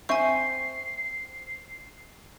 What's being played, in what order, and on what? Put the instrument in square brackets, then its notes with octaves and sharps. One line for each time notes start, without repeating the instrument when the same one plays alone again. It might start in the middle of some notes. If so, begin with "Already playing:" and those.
[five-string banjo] C4 C5 E5 [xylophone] G#5 C#6 [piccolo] C7